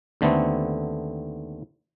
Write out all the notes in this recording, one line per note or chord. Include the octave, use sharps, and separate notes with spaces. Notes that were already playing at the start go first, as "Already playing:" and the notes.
D#2 D3 A3 B3 C4